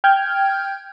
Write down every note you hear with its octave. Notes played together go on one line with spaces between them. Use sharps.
G5 F6 G6 G#6